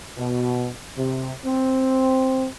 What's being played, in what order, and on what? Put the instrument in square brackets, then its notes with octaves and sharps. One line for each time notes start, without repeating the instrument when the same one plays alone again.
[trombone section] B2
C3
C4